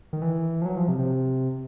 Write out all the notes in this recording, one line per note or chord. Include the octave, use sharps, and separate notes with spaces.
D#3
E3
F3
F#3
F3
C3
C3